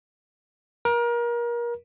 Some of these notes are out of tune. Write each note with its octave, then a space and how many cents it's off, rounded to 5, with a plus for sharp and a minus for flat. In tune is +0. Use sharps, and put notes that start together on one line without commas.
A#4 +30